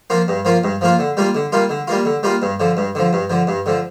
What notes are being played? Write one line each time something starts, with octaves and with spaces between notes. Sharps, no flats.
F3 A#3 F4
G2
F3 A#3 F4
G2
F3 A#3 F4
D3
G3 A#3 F4
D3
G3 A#3 F4
D3
G3 A#3 F4
D3
G3 A#3 F4
G2
D3 F3
G2
D3 F3
G2
D3 F3
G2
D3 F3